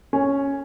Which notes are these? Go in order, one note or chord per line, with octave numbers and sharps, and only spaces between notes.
C#4